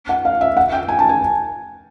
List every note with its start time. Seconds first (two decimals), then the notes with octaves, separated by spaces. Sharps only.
0.09 F#5
0.25 F5
0.41 E5
0.57 F#5
0.72 G5
0.88 G#5
0.99 A5
1.09 G#5